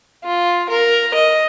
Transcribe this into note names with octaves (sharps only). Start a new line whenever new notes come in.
F4
A#4
D#5